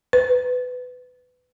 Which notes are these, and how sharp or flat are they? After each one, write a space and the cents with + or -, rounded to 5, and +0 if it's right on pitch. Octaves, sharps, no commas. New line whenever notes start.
B4 +20